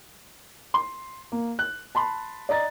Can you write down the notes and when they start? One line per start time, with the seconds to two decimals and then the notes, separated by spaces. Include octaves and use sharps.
0.74 C6
1.32 A#3
1.59 F#6
1.95 A5 B5 C6
2.49 D5 D#5 A#5 A6